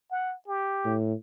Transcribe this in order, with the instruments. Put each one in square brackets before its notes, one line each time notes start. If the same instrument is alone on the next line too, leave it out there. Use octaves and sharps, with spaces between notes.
[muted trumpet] F#5
G4
[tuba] A2